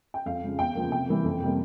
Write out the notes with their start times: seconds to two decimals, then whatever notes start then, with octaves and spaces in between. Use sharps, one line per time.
0.14 G5
0.26 F2 F5
0.42 C#3 F3 G#3
0.59 E2 G5
0.75 C#3 F3 A#3
0.92 C3 G5
1.08 E3 G3 A#3
1.24 F2
1.42 C3 G3 A#3